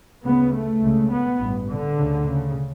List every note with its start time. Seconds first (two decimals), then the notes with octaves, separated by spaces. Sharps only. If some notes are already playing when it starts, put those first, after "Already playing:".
0.24 D2 C#3 B3
0.53 A3
0.82 C#2 C#3
1.10 B3
1.39 A1 G2
1.68 D3
1.97 D2 C#3
2.26 C#3